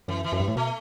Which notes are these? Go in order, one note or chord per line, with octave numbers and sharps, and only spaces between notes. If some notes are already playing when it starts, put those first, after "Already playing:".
F#2 E3
E3
F#2
G2
A2
B2 A3